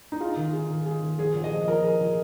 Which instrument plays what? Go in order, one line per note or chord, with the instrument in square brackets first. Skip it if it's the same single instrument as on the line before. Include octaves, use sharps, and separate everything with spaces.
[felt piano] D#4
[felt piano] F4 [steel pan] G#4
[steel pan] D#3
G#4
D#3
G#4
D#3
[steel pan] F3 [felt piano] G#4
[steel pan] F3
[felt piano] D#5
[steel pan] G#4
[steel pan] F3 [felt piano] A#4
[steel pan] G#4
F3